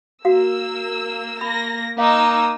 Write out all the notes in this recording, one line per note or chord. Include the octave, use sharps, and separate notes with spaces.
A#3 F#4 F5 E6
A#3 B5 A#6
A#3 D#4 F5 D#6 E6